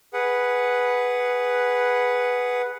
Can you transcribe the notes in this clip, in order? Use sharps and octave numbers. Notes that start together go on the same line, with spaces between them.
G#4 B4 F#5